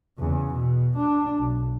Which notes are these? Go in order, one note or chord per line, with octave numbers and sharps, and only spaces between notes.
E2 C#3
B2
D4
B1